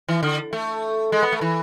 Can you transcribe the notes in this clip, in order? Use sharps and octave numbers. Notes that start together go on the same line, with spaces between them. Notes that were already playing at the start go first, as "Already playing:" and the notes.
E3
D3
A3
G#3
B3
A3
E3